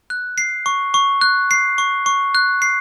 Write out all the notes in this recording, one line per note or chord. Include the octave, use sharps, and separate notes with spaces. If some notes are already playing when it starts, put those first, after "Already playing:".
F#6
C7
C#6
C#6
F#6
C7
C#6
C#6
F#6
C7